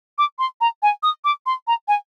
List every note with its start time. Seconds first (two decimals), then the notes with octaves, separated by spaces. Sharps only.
0.18 D6
0.39 C6
0.61 A#5
0.83 G#5
1.03 D#6
1.25 D6
1.46 C6
1.67 A#5
1.88 G#5